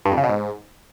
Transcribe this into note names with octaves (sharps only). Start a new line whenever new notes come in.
G2
F2
C#3
B2
G#2